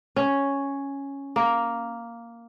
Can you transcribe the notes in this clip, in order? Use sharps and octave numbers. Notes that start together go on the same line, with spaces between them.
C#4
A#3